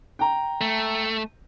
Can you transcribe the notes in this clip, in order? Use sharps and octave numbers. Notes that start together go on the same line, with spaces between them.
G5 A#5
A3